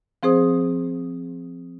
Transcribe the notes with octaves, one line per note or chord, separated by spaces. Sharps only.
F3 C4 G#4 C5 D#6